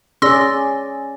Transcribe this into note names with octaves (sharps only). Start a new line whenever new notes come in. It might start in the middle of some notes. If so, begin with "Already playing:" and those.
C#4 G#4 D5 C6 E6 A#6